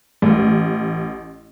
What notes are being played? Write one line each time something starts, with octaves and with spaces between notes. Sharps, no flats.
A1